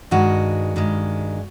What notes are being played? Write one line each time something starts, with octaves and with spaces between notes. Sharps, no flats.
G2 D#3 G#3 F#4
G2 D#3 G#3